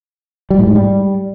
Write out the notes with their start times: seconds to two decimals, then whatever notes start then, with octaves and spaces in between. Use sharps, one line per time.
0.50 G3
0.59 A2
0.67 G#2
0.76 G3